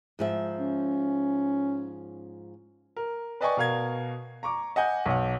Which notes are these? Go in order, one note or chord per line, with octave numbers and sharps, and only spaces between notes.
G#2 F3 E5
C#4
A#4
B4 D5 D#5 G5 G#5 C#6
B2 A#4 F5 G#6
A#5 C#6 D6
D#5 F#5 G#5 G6
B1 F#5